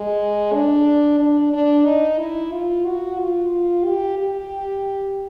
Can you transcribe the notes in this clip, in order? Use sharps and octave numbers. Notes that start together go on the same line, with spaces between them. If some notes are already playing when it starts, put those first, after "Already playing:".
Already playing: G#3
D4
D4
D4
D#4
E4
F4
F#4
F4
G4
G4